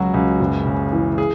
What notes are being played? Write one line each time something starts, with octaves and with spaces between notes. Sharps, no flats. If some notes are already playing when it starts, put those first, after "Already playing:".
Already playing: C#2 F#3 F#4
C#2
F#1
C#3
E3
G#4